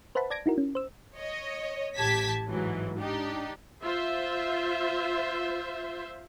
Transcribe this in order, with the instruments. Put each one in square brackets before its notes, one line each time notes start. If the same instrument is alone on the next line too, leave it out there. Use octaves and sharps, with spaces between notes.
[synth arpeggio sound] B4 C5 E5 F#5 A5 B5
D5 A5 G#6 A#6 D7
D#4 E4 F#4 A#4
C#4
C5 E6
[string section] C#5 D#5
A1 G4 A5 G#6 B6
G#2 E3 F#3
D4 D#4 G4
[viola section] F4 C5 E5